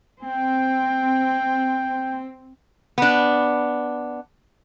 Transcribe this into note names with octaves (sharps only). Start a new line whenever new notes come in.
C4 G5
B3 D4